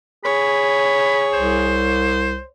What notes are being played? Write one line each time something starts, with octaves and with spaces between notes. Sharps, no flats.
G#4 C#5 B5
C2 C5